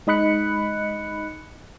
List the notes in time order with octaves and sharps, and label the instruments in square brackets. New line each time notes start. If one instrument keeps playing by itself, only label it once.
[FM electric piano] G#3 D#4 D#5 B5 F#6 C#7